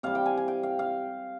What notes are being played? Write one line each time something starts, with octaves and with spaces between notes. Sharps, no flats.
C3 G3 F5
G5
G#5
G#5
G5
F5
F5